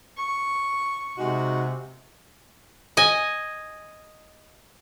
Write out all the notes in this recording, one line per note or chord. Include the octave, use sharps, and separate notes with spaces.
C#6
C3 G#3 D#4 F#4
D#5 G#5